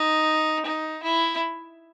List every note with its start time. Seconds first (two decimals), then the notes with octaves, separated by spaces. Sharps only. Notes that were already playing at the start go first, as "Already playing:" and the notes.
Already playing: D#4
0.66 D#4
1.03 E4